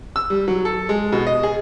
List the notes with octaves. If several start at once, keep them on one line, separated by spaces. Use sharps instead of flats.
E6
G3
F#3
A4
G#3
B2
D#5
G#4